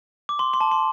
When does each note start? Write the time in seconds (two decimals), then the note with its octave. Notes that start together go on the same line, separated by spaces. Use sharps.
0.29 D6
0.39 C6
0.54 C6
0.61 A5
0.71 C6